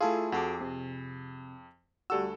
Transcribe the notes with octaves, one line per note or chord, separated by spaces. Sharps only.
A3 E4 F4 G#4 A4
F2 F#4 G#4 A4 D6
C3
D2 G3 F#4 A4 E6